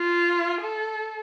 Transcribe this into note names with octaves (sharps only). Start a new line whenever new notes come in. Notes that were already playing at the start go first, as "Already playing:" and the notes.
Already playing: F4
A4